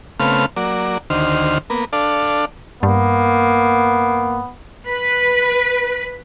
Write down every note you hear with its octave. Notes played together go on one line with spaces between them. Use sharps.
C#3 A3 B3 C4 F5 F6
F#3 A#3 D5
D2 D#3 C5 F6
A#3 B3
D4 A4 D5 F5
G2 A#3 B3
B4